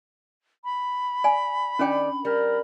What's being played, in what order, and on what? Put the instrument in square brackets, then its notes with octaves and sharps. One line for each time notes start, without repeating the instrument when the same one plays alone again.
[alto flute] B5
[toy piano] D5 G#5
[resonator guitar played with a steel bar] D#3 D5 [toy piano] C#4 D4 G5
[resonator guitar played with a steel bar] G3 [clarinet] A#4